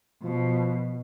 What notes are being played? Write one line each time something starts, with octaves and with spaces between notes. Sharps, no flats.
B2 F3